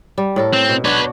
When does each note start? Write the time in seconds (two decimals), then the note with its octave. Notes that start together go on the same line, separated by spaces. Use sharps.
0.18 G3
0.36 A2 A4 A#4
0.54 C4
0.69 B2
0.85 D4 F#4 B4 C#5